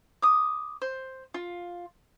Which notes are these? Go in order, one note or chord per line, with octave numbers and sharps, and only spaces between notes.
D6 D#6
C5
F4